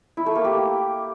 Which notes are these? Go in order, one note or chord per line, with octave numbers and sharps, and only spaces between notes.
E4
A3
A#3
G4